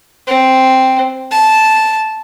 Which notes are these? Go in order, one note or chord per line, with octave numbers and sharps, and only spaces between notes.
C4
A5